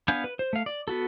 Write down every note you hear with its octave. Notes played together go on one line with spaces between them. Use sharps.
B3 D4 F5 G#5 G6
B4
C5
A3 F5
D5
B3 F#4 A4